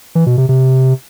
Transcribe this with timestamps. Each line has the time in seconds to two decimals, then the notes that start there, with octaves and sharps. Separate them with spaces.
0.15 E3
0.26 B2
0.38 C3
0.49 C3